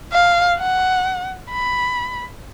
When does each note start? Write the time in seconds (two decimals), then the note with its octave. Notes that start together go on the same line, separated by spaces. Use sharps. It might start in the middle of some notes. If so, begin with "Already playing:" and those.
0.12 F5
0.58 F#5
1.51 B5